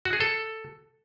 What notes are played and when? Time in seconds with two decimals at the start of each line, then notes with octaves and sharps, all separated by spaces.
0.05 F#4
0.13 G#4
0.20 A4